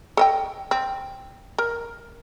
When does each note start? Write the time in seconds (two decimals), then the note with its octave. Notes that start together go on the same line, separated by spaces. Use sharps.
0.17 A4 D#5 G5
0.71 C4
1.58 A#4